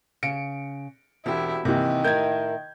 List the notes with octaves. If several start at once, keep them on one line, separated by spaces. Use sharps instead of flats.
C#3 C#7 D7
E1 C4 E4 F#4 G4
C3 D#3 E3 A#3
A2 E4 A#4 G6 G#6